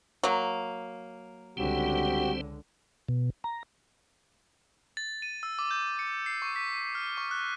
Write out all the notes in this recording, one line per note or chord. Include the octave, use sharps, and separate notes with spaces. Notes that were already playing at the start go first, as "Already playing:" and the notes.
F#3 A#3
C#2 D3 G3 C4 F#4 G4 C5
B2
A#5
A6
D#7
E6
D6
G6
C#7
C7
C#6
B6
F6
C#6
F#6